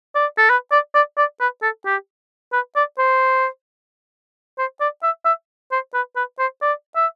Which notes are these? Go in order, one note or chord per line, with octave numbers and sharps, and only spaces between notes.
D5
A4
B4
D5
D5
D5
B4
A4
G4
B4
D5
C5
C5
D5
E5
E5
C5
B4
B4
C5
D5
E5